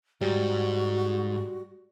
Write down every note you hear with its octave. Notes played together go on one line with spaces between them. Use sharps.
G#2 G3 F#4